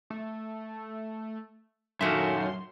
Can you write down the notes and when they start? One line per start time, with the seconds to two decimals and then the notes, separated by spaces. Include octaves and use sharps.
0.10 A3
2.01 F#2 A#2 D#3 F#4 A4 E5 C6